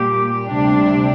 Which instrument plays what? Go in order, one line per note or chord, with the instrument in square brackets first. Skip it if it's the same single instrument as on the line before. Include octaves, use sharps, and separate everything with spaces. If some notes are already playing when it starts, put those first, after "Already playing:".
Already playing: [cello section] A#2 G3 A#3 [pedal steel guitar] G4
[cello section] D2 C3 G3 D4